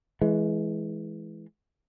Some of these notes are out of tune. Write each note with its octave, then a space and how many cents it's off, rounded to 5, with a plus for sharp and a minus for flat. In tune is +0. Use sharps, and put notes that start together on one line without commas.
E3 +0 G#3 +25